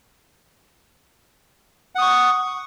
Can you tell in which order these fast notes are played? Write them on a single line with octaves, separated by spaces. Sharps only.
F#5 D#6 C#6